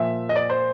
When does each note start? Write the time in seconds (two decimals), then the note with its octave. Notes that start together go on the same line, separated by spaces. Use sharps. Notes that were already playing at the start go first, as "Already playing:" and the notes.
Already playing: A#2 F3 E5
0.29 D#5
0.36 D5
0.50 C5